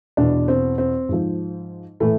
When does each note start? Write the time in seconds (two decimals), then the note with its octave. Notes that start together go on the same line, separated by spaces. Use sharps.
0.17 E2 B2 D4
0.48 C4
0.78 C4
1.09 G#2 F3
2.00 A2 E3 A3